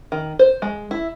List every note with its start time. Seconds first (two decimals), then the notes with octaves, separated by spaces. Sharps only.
0.12 D#3
0.39 C5
0.62 G#3
0.91 E4